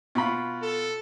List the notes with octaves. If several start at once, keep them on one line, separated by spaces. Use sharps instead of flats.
B2 F4 B5
A4